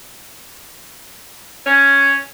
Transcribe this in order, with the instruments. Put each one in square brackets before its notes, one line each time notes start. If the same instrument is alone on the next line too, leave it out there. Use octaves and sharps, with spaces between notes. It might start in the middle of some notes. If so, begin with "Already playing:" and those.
[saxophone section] C#4